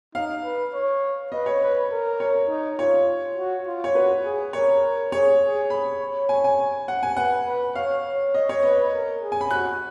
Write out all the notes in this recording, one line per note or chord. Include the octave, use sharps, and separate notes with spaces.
D#4 F5
B4
C#5
B4 D#5
C#5
B4
A#4
C#5
D#4
F4 C#5
F#4
F4
C#5
F#4 B4
G#4
A#4 C#5
G#4 C#5
G#4
B5
C#5
G#5
G#5
F#5
G#5
B4 F#5
B4
C#5 F5
C#5
D#5
C#5
B4 D#5
A#4
G#4
G#5
B5
F#4 F#6